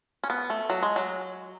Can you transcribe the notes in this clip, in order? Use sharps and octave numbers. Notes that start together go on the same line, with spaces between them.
C#4
B3
A3
F#3
G#3
F#3